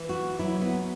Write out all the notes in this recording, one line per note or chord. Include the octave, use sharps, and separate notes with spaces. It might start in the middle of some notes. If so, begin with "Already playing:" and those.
Already playing: E3
F#4
F#3 E4
B3